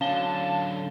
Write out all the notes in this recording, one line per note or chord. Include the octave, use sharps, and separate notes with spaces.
D3 F#3 C#4 F5 A5 G7